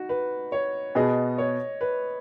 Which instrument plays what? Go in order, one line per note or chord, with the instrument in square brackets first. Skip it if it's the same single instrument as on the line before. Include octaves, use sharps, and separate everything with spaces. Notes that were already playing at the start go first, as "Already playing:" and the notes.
Already playing: [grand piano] D#4 F#4
B4
C#5
[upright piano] B2 B3 G#4 [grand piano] D#5
[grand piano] C#5
B4